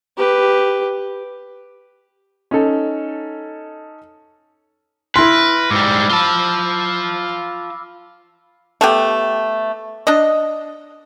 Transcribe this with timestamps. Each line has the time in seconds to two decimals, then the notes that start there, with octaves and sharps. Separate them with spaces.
0.17 G4 B4
2.51 C#4 D#4 A4
5.16 E4 B4 C6 F6 A#6 D7
5.71 G#2 G3 D6 E6 G7
6.11 F4 A5 B5 E6
8.81 A3 B3 G4
10.07 D4 D#5